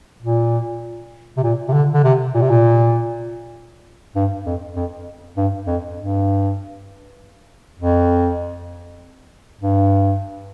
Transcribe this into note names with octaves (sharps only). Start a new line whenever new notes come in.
A#2
C3
A#2
C3
D3
D3
C3
A#2
C3
A#2
G2
F2
F2
G2
F2
G2
F2
G2